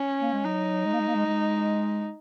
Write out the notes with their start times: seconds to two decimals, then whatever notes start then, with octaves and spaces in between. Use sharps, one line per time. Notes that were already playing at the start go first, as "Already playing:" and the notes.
Already playing: C#4
0.21 A#3
0.33 G#3
0.45 F#3 D#4
0.85 G#3
0.93 A#3
1.00 G#3
1.08 A#3
1.15 G#3
1.26 G#3